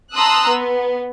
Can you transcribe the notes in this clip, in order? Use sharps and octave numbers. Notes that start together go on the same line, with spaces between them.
A5 A#5 C6 D#6 E6 F#6
B3